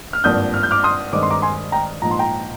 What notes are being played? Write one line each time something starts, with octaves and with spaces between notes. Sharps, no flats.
F6
G#1 G2 F3 A#3 D#6 G6
F6
G6
D6 F6
C6 D#6
G2 D#3 G#3 C4 D6
C6
A#5 D6
G#5 C6
G5 A#5
A#1 G#2 F3 A#5
C6
G5 A#5